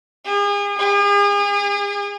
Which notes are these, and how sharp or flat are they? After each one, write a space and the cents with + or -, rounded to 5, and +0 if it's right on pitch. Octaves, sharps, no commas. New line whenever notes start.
G#4 -40
G#4 -40